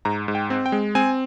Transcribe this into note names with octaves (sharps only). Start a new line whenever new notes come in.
G#2 A#5
G#2
G5
C4
G5
G#3
C4 G#5